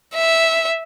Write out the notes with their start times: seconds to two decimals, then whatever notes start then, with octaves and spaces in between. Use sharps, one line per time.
0.14 E5